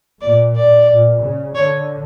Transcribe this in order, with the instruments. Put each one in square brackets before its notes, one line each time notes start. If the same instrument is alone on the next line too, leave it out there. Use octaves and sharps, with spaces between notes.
[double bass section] A#2 [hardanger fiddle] D5
[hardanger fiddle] D5
[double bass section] A#2
C#3
[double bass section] D3 [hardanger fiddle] C#5